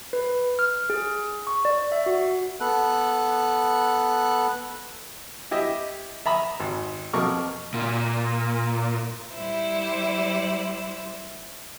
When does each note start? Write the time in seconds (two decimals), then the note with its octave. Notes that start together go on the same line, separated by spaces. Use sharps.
0.13 B4
0.59 F6
0.90 G#4
1.47 C#6
1.65 D5
1.92 E5
2.06 F#4
2.61 B3 A4 F#6
5.51 E4 G4 D#5 E5
6.26 E5 A#5 B5 D#6
6.60 G#1
7.13 F2 B2 A#4 C#6 D6
7.74 A#2
9.34 G3 E4 C5